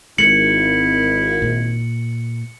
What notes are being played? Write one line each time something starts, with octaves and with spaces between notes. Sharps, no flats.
G#1 G#3 E4 C#7 F#7
A#2